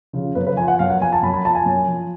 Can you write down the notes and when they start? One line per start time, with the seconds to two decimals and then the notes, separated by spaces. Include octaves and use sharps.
0.13 C#3 F3
0.35 F#2 B4
0.47 B4
0.57 F3 G#5
0.68 F#5
0.79 F#2 F5
0.90 F#5
1.01 F3 G#5
1.13 A5
1.22 F#2 B5
1.34 B5
1.45 F3 A5
1.55 G#5
1.66 F#2
1.88 F3